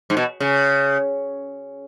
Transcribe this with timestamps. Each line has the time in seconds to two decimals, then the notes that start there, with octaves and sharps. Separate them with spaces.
0.10 G#2
0.17 B2
0.40 C#3